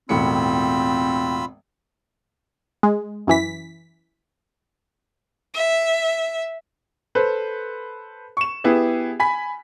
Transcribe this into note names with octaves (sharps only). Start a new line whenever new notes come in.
E1 A2 C4 F4 B5 E6 C#7
G#3
F#2 E3 B6
E5
A4 B4 C5
C#6 E7
B3 E4 G4 G#4
G#5 B5 B6